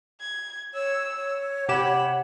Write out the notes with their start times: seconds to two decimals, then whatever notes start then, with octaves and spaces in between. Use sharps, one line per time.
0.20 G#6
0.74 C#5 E6
1.17 C#5
1.68 C3 G4 F#5 B5 E7